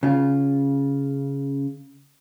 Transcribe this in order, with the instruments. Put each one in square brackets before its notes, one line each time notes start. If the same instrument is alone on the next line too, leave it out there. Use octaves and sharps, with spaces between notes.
[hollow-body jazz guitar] C#3 F4